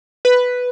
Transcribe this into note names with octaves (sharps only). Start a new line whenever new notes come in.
B4